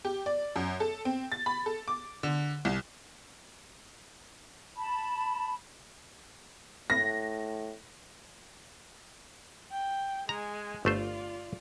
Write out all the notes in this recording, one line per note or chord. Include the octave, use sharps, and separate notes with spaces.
G4
D5
F#2
A4
C4
A6
B5
A4
D6
D3
C2
A5 B5
A2 A#6
G5
G#3 G#5 A#5
G1 A3 F4 C5 D5